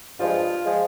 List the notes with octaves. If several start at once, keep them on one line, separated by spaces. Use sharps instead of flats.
G2 F3 G#3 F4
F3 G#3